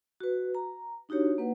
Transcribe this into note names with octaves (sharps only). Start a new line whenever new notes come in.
F#4 B4
A#5
D4 D#4 F#4 G4 C#5
A#3 B4 F#5